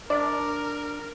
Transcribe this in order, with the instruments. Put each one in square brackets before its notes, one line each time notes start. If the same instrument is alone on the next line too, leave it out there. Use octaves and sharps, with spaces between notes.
[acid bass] D4 [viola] A#4 [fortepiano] D5